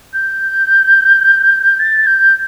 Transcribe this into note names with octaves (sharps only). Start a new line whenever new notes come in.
G6
A6
G6